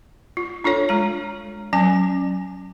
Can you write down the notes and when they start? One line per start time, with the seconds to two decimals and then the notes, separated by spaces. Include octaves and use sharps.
0.37 F4
0.64 D4 F4 A4 C#5
0.89 G#3 A#5
1.73 F#3 C#4 G#5